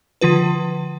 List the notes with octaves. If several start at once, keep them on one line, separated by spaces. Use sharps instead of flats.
D3 F3 F4 B4